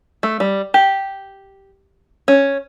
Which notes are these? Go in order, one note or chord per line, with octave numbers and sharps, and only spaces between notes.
A3
G3
G4
C#4